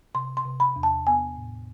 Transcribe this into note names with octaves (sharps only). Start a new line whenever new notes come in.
C3 C6
C6
C3
B5
E2
A5
B3 G#5
A2